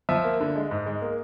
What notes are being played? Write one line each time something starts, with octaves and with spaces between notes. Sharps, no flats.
F3 E5
A#3
D3
G#3
G#2
G#3
A#3